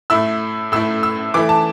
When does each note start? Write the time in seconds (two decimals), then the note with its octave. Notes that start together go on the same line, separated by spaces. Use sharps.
0.10 A2 A3 E4 E6
0.72 A2 A3 E4 E6
1.03 E6
1.34 E3 A3 E4 D6
1.49 A5